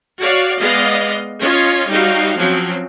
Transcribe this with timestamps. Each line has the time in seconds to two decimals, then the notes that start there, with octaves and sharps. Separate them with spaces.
0.20 F#4 C#5 D5 F5
0.60 G#3 B3 D5 D#5 F5
1.40 C#4 F4 C#5 D#5
1.89 G3 D#4 F#4 C#5 F5
2.39 F3 F#3 C4 C#4